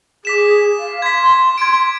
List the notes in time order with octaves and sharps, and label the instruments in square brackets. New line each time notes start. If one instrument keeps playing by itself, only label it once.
[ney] G#4 [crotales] D6 B6 E7
[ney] F5
[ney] C6 [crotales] G#6 B6
[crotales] G#6 D7